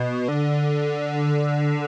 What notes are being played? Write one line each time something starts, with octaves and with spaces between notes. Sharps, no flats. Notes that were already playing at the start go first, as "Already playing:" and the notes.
Already playing: B2
D3